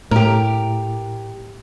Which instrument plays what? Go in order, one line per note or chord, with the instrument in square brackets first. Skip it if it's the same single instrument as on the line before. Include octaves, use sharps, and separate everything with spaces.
[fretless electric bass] A2 [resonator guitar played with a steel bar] G4 A#4